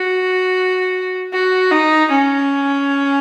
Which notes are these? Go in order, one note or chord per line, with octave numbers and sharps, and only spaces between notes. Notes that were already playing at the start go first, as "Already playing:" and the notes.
Already playing: F#4
F#4
D#4
C#4